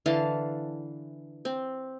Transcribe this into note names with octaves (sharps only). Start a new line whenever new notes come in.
D3 E3 F5 A5
C4